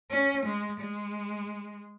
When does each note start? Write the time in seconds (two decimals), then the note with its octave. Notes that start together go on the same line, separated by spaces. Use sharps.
0.11 C#4
0.45 G#3
0.80 G#3